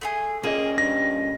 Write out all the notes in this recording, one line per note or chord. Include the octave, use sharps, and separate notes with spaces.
A3 F4 G#4
A#2 A#3 C#4 G#4 D#5
G2 A#6